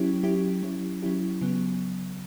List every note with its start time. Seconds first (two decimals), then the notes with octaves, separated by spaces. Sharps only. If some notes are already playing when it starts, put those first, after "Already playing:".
Already playing: F#3 C#4 E4 G4
0.23 F#3 C#4 E4 G4
0.63 F#3 C#4 E4 G4
1.03 F#3 C#4 E4 G4
1.41 C#3 F#3 B3